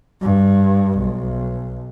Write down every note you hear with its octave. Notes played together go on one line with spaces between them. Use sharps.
G2
B1